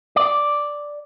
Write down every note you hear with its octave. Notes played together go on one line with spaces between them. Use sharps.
D5